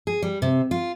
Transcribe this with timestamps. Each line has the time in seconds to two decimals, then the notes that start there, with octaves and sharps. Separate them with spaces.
0.07 G#4
0.22 G3
0.42 C3
0.71 F4